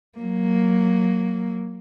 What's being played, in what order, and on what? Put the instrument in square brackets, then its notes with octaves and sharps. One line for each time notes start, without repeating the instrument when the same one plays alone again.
[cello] F#3 A#3